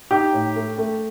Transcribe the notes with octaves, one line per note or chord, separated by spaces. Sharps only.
D#4 G4
A2
A3
A3